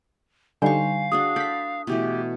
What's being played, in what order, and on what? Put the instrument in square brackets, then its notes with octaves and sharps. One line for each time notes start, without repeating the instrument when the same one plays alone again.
[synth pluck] D3 G3 D#4 [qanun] C5 C#6 [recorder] F5 [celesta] G#5
[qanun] D4 F#4 G#4 [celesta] D#6
[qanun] A4 B5 D6 [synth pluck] G6 B6
[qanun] B2 E3 A3 [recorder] G4